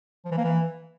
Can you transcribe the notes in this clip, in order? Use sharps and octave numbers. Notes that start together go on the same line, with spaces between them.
F3
E3
A#3
E3